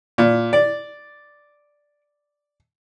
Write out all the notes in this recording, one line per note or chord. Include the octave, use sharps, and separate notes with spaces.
A#2
D5